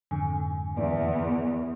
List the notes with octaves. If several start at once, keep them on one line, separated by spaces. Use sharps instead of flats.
F2 G#2 D3 G#5
E2 D5